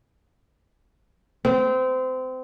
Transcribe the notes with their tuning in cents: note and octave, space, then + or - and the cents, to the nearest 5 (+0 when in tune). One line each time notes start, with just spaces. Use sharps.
C4 -25